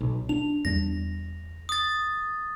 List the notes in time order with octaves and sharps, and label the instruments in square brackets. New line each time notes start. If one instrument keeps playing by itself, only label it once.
[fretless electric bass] B1
[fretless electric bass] D4 [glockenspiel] F7
[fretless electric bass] E2 G3 D4 [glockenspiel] A#6
[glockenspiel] D#6 A6